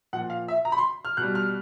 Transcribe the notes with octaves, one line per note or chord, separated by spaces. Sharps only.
A#2 F3 F#5
F5
E5
A#5
B5
C6
F6
B2 G3 F#6
F6